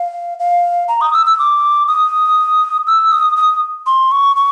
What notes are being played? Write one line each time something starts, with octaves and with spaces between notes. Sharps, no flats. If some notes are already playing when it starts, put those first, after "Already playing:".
Already playing: F5
F5
A#5
D#6
E6
E6
D6
D#6
E6
D#6
D#6
C6
C#6
C#6